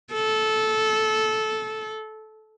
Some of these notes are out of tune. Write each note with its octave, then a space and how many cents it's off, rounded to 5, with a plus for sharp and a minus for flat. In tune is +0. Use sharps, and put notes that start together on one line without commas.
A4 -15